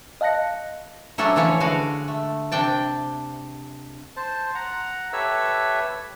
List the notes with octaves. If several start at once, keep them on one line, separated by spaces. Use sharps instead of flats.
D#5 F5 A5 F#6 A#6 C#7
F#3 A3 C#4 D4 A4
E3 F3 C#4 C#5
D3 G#3 F#4 F5
A3
C3 D4 G5 A5
C5 A5
F#5 A#5
G4 A4 B4 C#5 E5 E6